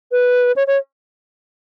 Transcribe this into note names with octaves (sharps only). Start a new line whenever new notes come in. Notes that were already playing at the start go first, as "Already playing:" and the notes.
B4
C#5
C#5